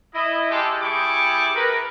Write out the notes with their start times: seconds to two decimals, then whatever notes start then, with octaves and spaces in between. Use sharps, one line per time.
0.14 E4 D#5
0.50 G#3 G4 A4
0.82 G3 E4 G4 G#4 C#6 D6
1.55 A#4 B4